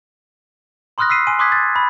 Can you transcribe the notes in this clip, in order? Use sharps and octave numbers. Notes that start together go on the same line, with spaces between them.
B5 C6 D#6 F6 F#6 A#6
E6 B6 C7 D#7
G#5 C6 D#7
C6 D6 D#6 F#6 G#6 B6
G#6 A6
B5